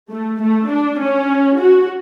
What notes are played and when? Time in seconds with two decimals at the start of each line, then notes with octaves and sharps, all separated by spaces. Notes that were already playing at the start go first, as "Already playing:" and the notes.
0.11 A3
0.41 A3
0.70 D4
0.99 C#4
1.58 F#4